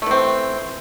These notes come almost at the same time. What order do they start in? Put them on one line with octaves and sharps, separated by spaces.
A3 E3 C4